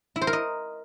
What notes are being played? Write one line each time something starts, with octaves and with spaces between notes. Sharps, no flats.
E4
C5
A#4
D#5